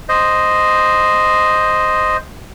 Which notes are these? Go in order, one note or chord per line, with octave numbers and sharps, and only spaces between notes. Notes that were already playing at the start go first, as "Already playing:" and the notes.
C5 D#5